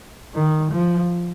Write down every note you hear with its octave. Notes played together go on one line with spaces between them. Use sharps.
D#3
F3